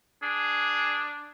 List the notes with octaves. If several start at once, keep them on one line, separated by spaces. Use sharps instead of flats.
D4 G#4